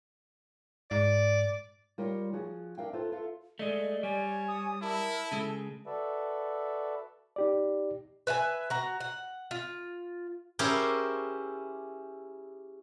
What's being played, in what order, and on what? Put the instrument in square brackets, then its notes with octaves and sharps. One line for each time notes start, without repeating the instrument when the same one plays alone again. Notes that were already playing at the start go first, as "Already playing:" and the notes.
[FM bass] G#2 [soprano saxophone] D5
[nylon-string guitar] G3 F4 A#4 C#5
F3 F#4 G#4
D4 A#4 E5 F5 G5
E4 F4 A4 B4 C5
F4 A4 E5 F5
[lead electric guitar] G#3 A3 [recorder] D5 [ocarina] D#5
[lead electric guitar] G3 [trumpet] C#5 [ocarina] G#5
[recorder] D#6
[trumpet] E4 [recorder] A#4 [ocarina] A5
[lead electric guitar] C#3 G#3 [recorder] A4
[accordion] F#4 A4 B4 D5 E5
[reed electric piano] D#4 G4 D5
[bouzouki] B4 E5 F5 G#5
F#4 A#5
F#5
F4
[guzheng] C#4 E4 G4 G#4 A#4 C5